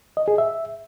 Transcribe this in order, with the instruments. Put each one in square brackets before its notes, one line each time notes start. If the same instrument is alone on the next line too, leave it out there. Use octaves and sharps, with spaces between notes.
[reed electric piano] D#5
G#4
E5